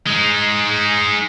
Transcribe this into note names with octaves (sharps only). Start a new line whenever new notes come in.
G#3 D#4